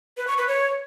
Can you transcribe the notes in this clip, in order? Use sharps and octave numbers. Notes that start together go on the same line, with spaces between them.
B4
C#6
B4
C#5